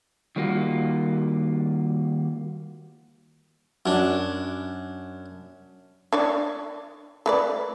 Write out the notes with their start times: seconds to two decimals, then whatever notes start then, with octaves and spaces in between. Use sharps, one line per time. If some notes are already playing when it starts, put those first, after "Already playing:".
0.36 D#3 G3 A#3 F4 F#4
3.86 F#2 D4
6.13 D4 C#5 D5
7.26 A3 B4 D5